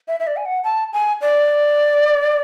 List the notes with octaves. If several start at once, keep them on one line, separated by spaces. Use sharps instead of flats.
E5
E5
D5
G#5
F#5
A5
G#5
D5